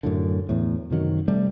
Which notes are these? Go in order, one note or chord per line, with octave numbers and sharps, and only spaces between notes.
F#2 A2 D3
E2 A2
F#2 C3 D#3 F#3
C3 G3 A3